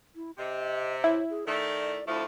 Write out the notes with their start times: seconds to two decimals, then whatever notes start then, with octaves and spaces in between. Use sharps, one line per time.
0.16 E4
0.38 C3 D#5
1.04 E4 C#5
1.30 G#4
1.47 D#3 A3 D5
2.07 D2 F3 A3 E4